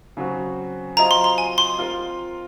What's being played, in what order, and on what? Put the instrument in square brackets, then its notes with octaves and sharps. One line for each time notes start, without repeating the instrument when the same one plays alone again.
[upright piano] C#3 F#3 C4 F#4
[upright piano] F#3 C4 F4 C5 D#5 [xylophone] A#5
[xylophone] C6
C6
G#5
C6
[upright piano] C4 F4 A#4 F5